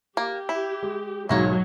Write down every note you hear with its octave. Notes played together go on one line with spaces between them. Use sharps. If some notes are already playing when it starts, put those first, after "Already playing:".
A#3 G4
E4
G#3
B1 G#2 F#3 A3 A#3 C#5 A#6